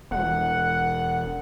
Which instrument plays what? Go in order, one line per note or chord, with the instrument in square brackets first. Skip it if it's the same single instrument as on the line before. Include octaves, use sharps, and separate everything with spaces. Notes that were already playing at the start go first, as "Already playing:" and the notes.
[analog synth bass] E1 [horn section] F#5